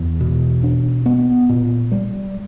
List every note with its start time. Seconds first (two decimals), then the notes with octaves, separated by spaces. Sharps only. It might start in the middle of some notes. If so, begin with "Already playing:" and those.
Already playing: E2
0.20 B2
0.63 D4
1.06 B3
1.49 A#2
1.92 G3